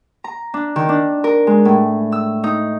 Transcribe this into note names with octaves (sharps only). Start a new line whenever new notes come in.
A#5
D4
D#3
D4
A#4
G#3
A2
E6
D#4